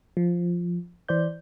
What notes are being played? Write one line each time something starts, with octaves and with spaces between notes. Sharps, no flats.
F3
E3 C5 D5 G6